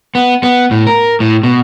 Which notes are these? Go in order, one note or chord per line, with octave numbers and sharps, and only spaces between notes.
B3
B3
A2
A#4
A2
B2